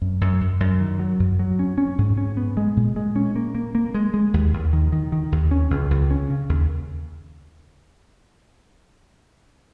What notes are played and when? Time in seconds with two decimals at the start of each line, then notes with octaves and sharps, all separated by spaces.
0.02 F#2
0.21 F#2
0.41 F#2
0.60 F#2
0.80 D#3
0.99 F#3
1.19 F#2
1.39 F#3
1.59 C#4
1.78 C#4
1.98 G#2
2.18 C#4
2.37 B3
2.57 G#3
2.77 A#2
2.96 G#3
3.16 C#4
3.36 A#3
3.55 A#3
3.75 A#3
3.94 G#3
4.14 G#3
4.34 D#2
4.53 D#2
4.73 D#3
4.92 D#3
5.12 D#3
5.32 D#2
5.51 C#4
5.70 C#2
5.91 C#2
6.10 C#4
6.30 C#3
6.49 D#2